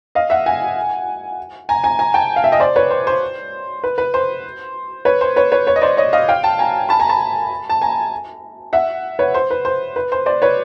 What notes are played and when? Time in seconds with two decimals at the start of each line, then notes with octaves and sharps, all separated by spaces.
0.15 D#5 F5
0.30 E5 F#5
0.46 F#5 G#5
1.69 G#5 A#5
1.84 G#5 A#5
1.99 G#5 A#5
2.14 G5 A5
2.36 F5
2.44 E5
2.52 D#5
2.60 C5 D5
2.76 B4 C#5
2.90 C5
3.07 C5
3.84 B4
3.98 B4
4.14 C5
5.05 B4 C#5
5.21 C5
5.36 B4 C#5
5.52 B4 C#5
5.67 B4 C#5
5.76 D#5
5.82 C5 D5
5.97 C#5 D#5
6.13 D#5 F5
6.28 F5 G5
6.44 G5 A5
6.59 G#5 A#5
6.89 A5 B5
6.99 G#5 A#5
7.09 A5 B5
7.70 A5
7.81 G#5 A#5
8.73 E5 F#5
9.19 B4 C#5
9.34 C5
9.51 B4
9.65 C5
9.96 B4
10.12 C5
10.26 C5 D5
10.42 B4 C#5